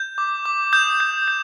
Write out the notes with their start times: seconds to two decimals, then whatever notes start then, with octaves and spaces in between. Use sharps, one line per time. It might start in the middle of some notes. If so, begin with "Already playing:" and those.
Already playing: G6
0.18 D6
0.46 D6
0.73 D#6 G6
1.00 G6
1.28 G6